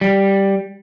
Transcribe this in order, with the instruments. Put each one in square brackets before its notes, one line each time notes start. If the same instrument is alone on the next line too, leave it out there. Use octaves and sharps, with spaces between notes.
[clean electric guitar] G3